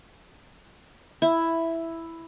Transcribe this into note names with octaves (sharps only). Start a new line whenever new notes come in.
E4